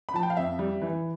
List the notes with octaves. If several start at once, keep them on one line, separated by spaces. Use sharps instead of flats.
B5
F3 A5
G5
F5
F2 E5
G3
E3